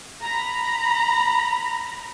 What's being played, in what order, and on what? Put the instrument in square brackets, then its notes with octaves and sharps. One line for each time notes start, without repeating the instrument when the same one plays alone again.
[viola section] A#5 B5